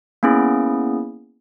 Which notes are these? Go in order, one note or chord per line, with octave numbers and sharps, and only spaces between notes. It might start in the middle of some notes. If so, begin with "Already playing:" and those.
A#3 B3 C#4 E4 G#4